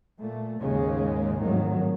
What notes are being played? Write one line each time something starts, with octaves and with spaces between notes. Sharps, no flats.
A#2 A3
D#2 G#2 C#3 G#3
G#1 A2 D#3 F3 F#3